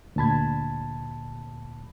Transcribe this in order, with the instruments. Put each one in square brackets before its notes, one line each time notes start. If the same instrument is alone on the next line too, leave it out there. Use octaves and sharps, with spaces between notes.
[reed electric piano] D2 A#2 A5 B5 G#6